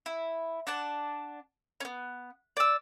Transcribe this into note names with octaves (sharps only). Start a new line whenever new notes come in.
E4
D4 F#5 A5
B3 C#4
D5 E6